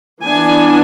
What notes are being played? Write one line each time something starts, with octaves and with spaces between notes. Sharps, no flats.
E3 B3 D4 G#5